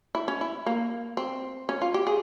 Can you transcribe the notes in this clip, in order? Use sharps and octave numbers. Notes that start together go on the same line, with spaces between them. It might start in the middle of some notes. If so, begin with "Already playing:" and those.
E4
C#4
E4
A#3
C4
C#4
F4
G4
G#4